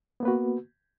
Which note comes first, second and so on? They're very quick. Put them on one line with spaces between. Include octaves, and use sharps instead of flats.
B3 A#3 B4 F#4